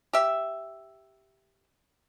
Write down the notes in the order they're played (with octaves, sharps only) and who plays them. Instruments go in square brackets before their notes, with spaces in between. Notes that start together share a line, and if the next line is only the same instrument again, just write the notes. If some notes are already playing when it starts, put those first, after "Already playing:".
[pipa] G4 E5